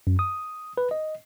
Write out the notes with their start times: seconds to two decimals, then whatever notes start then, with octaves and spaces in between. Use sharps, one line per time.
0.07 F#2
0.19 D#6
0.78 B4
0.91 D#5